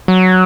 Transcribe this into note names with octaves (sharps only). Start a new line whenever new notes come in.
F#3